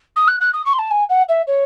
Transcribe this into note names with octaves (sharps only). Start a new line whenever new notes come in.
D#6
F#6
F#6
D#6
C#6
C6
A5
G#5
F#5
E5
C#5